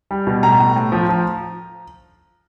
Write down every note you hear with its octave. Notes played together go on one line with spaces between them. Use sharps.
G3
B2
A2 A#5
A2
A2
F3
F3